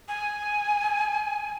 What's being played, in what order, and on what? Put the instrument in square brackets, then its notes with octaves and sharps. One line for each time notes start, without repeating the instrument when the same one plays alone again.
[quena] G#5